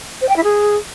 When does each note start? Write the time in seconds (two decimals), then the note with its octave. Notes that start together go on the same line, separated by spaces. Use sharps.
0.21 C5
0.29 G5
0.36 E4
0.44 G#4